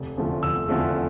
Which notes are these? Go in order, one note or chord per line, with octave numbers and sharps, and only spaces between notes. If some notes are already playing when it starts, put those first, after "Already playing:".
Already playing: F1
E2 D3 F3 A3
F1 E6
E2 D3 F3 A3